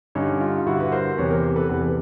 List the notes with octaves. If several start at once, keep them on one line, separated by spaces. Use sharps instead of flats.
G2 D3 C#4 D#4
D#4 F4
G2 D3 E4 F#4
B4
A#4 C5
E2 C3 E3 B4 C#5
A#4 C5
A4 B4
E2 C3 E3 A4 B4